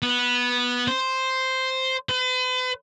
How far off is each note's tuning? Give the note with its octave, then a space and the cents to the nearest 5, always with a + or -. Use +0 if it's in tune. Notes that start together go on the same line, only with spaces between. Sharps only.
B3 -10
C5 +0
B4 +45